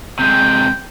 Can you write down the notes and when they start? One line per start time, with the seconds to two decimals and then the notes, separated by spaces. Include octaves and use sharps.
0.19 C3 G#3 G5